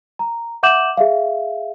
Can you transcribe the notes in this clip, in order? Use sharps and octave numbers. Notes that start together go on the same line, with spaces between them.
A#5
E5 F#5 D6 G6 E7 F#7
G#4 E5 F5